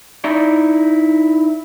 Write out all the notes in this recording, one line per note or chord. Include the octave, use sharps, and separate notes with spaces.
D#4 E4 D5